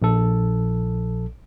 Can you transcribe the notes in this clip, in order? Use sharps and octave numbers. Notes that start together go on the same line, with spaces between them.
A#1 A4